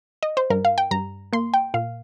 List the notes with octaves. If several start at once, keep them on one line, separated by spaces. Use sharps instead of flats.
D#5
C5
G2 A#4
F5
G5
G2 A#5
A#3 C6
G5
A#2 F5